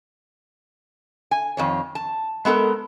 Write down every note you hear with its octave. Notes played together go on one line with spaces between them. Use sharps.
G#5
F2 D#3 C#5
A5
G#3 B3 A4 A#4